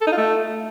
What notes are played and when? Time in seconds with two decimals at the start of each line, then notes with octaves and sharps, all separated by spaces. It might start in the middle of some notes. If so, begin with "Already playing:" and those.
0.01 A4
0.07 D#4
0.12 F4
0.18 A3